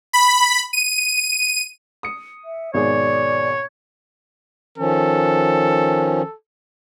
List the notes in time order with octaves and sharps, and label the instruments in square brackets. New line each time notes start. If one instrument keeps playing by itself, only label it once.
[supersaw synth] B5
D#7
[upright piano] D#6 C#7
[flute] E5
[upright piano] G#1 B2 G#4 [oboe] C#5 [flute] D5
[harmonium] D#3 F3 C#4 [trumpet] A4